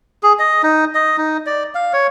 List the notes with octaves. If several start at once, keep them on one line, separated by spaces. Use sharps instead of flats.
G#4
D#5
D#4
D#5
D#4
D5
F5
C#5